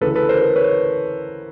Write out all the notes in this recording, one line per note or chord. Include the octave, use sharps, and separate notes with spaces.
D2 C#3 E3 A4 B4
A4 B4
A#4 C5
A4 B4
B4 C#5